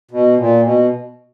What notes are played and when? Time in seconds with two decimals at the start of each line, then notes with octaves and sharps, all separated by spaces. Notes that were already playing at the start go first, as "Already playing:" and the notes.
0.11 B2
0.38 A#2
0.63 B2